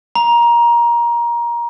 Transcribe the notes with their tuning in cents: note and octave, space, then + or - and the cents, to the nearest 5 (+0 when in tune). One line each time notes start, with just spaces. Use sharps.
A#5 +20